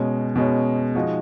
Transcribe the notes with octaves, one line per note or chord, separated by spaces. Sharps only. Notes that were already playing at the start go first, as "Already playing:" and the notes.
Already playing: B2 G#3 C#4
B2 G#3 C#4
F3 G#3 D#4 F#4